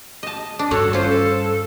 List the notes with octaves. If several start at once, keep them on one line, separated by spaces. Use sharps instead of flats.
D#5 A5
D4
G2 F#4 A4 C#5 F#5
C#4 F4 C5
A4